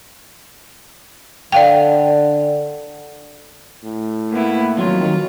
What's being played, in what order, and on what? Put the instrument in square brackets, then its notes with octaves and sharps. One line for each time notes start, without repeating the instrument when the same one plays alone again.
[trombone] D3 [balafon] D5 F5 G5
[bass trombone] A2
[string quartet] A#3 B3 E4
[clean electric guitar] F2 F#3 [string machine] D#3 [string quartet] F4